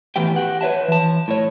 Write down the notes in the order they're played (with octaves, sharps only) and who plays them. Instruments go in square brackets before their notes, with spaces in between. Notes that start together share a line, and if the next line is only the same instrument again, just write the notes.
[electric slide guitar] A2 E3 B3 G4 G5
G4 F#5
B4 C#5 E5 A5
E3 A5
A2 C#5